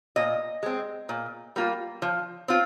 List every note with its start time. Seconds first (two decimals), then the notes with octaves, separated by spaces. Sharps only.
0.16 A#2 D#5
0.63 G#3 C4
1.09 A#2
1.56 G3 A#3 F4
2.02 F3
2.48 C4 F4